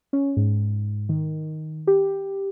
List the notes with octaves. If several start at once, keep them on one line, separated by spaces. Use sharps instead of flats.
C#4
G#2
D#3
G4